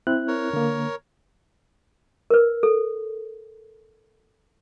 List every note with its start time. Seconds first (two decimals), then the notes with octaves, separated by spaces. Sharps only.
0.07 C4 E4 F#6
0.28 A#4 C#5
0.53 D3 A#3
2.30 A#4 B4
2.63 A4